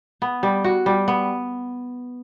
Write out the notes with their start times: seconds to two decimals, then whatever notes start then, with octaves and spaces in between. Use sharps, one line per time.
0.22 B3
0.43 G3
0.64 F#4
0.86 G3
1.08 B3